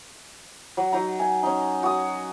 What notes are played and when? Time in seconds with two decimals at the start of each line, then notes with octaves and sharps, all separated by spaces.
0.77 F#3
0.92 F#3 D#4 A#5
1.19 G#5
1.43 C#4 D#4
1.83 F#4 D#6